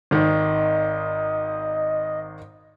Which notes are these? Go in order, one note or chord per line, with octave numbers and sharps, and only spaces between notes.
G#1 D#3 D#5